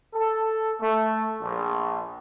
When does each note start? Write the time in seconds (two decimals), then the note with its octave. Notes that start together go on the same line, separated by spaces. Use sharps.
0.14 A4
0.80 A3
1.41 A#1